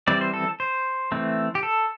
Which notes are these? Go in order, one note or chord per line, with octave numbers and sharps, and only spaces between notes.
E3 G3 C4 D5
C5
A4
C5
E3 A3 C4
G4
A4